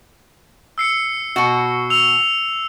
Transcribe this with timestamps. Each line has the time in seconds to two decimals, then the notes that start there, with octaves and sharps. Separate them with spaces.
0.78 E6 C7 C#7
1.36 B2 F#4
1.90 E6 F7